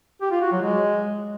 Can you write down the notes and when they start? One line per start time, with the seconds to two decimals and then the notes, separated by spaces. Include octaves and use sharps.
0.21 G4
0.31 F4
0.42 F#4
0.52 F#3
0.62 G#3